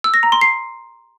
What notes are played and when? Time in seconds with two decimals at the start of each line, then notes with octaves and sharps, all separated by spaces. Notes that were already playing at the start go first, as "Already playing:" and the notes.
0.04 E6
0.14 A#6
0.23 A#5
0.32 C6
0.41 C7